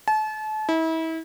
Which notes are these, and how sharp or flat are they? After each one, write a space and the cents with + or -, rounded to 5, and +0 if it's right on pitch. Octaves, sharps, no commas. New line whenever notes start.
A5 -35
E4 -35